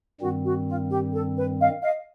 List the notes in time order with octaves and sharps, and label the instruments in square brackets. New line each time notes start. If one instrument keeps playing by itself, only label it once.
[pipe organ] G2 D#3 G3 C4 [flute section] F#4
[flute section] F#4
F4
G4
A4
B4
D#5 F5
D#5 F5